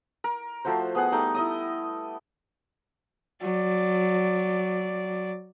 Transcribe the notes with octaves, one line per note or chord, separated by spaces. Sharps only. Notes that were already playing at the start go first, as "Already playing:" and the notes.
A#4
F3 A3 F#4 C5
B3 G#4 F#5
G3 A3 D#4
E4 D#5 D#6
F#3 D5